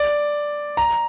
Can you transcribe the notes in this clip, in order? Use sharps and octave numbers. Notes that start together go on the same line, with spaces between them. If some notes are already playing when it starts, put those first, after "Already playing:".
Already playing: D5
A#5